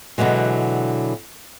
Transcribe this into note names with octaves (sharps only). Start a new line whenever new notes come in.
B2 D3 E3 F#3 G#3